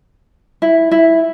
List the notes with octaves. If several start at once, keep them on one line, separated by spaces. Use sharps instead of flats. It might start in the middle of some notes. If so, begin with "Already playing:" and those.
E4
E4